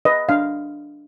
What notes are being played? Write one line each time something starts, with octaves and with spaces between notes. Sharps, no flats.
B4 D#5
D4 F5